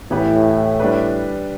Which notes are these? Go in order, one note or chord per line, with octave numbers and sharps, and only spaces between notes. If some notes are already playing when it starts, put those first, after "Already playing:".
A2 E3 B3 G4 B4
G3 D4 B4